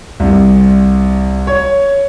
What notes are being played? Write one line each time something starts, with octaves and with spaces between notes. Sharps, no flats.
C2
C#5